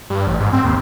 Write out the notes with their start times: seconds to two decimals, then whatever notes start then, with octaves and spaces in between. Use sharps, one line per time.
0.10 G2
0.27 A1
0.40 G#2
0.53 C4
0.65 D#2